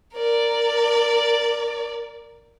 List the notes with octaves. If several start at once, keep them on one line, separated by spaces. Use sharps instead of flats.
A#4 D5